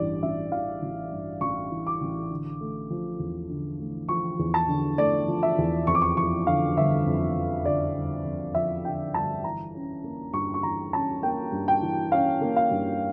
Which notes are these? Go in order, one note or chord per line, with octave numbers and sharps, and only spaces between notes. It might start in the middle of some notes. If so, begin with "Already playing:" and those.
Already playing: A1 G2 E3 D5
A1 E5
E3 F5
A1
G2
A1 C#6
E3
D6
A1
D3
A3
F3
E2
D3
A3
F3 C#6
E2
A5
D3
A3 D5
F3
E5
E2
F2 C#6
D6
C#6
F3 C#6
D3 F5
G1 E5
F2
F3
D3 D5
G1
F2
F3 E5
D3 G5
G1 A5
E3 A#5
C#4
A#3
G2 C#6
C#6
E3 A#5
C#4 A5
A#3 G5
G2
G5
E3
C#4 F5
A#3
F5
G2